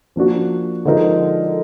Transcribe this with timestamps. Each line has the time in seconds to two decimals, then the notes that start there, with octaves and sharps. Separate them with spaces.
0.16 F3 A#3 D4 F#4
0.85 D3 F3 G#3 D#4 A#4